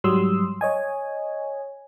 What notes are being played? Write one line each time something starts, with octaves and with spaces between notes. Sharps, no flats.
G#2 F#3 G3 C6 D#6 E6
C#5 D#5 G#5